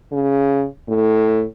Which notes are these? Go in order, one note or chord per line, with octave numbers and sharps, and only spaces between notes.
C#3
A2